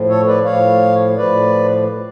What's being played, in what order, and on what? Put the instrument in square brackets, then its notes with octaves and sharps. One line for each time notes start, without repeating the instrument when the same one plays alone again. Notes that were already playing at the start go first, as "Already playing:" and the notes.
Already playing: [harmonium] A2 F3
A4 C#5
B4 D5
A2 F3 C#5 F5
A2 F3 B4 D5